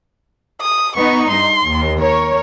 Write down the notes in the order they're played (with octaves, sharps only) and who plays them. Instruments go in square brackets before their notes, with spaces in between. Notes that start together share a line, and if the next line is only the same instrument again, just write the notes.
[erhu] D#6
[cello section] B3 D#4 [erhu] C#6
[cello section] G2 [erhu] C6
[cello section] D#2
[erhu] A#4 [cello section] C#5